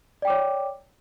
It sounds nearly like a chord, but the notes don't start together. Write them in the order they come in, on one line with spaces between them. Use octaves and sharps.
D5 G5 D6 C#5